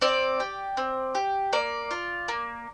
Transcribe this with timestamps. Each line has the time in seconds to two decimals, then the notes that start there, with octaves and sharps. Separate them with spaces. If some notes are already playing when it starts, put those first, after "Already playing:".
0.01 C4 D5
0.40 G4
0.77 C4
1.15 G4
1.53 A#3 D5
1.91 F4
2.28 A#3